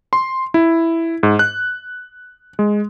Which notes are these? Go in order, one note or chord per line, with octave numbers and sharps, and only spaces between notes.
C6
E4
G#2
F#6
G#3